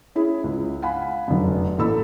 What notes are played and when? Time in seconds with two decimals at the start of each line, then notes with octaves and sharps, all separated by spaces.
0.15 C#4 E4 G#4
0.44 C#2
0.82 F5 F#5 G#5 B5
1.28 F1 F#2
1.78 A1 A#3 A4 B5 E6